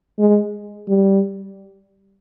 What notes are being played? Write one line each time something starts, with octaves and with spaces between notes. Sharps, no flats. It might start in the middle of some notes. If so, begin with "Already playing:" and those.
G#3
G3